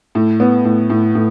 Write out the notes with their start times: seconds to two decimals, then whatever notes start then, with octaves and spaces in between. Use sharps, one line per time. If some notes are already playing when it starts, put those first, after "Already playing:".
0.15 A2
0.40 B3
0.65 A2
0.90 A2
1.15 A2